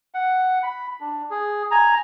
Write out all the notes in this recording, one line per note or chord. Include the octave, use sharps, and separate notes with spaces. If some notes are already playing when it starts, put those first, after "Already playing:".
F#5
B5
D4
G#4
G#5 A#5